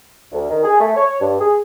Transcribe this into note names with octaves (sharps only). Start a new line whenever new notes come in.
D2
D#3
G#4
A3
C#5
G2
G#4